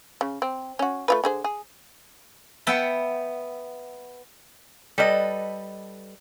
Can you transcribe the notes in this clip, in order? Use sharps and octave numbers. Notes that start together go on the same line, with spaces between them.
C#3
C4
C#4 F#4
A3 F4 B4
D3 G#4 C5
G#4
B3 E5 F#5 G5 A5 B5
G3 A4 B4 D#5